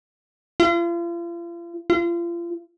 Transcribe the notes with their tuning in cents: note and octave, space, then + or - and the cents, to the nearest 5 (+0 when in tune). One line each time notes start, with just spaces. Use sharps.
F4 -40
F4 -35